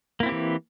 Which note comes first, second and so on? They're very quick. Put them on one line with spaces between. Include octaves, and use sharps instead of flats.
A#3 E4 C4 G4 E3